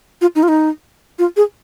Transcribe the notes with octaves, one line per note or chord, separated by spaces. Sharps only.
F4
D#4
F4
D#4
F4
G#4